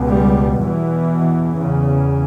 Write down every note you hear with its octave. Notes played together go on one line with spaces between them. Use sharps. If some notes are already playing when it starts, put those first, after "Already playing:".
Already playing: C#2 B2
G3
E2 B2 E3
E2 C#3